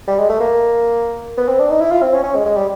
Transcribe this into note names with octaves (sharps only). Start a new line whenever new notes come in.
G3
G#3
A3
A#3
B3
C4
D4
D#4
E4
F4
C4
C#4
C#4
G#3
G#3
G3